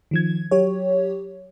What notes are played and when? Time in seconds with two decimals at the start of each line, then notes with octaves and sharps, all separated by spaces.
0.11 D#3 F3 G#6
0.51 F#3 G4 C#5